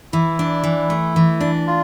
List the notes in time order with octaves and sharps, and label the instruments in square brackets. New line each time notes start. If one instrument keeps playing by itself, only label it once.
[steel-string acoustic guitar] E3 [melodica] E4
[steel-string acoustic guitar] D4
E3
A3
E3
D4
[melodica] F4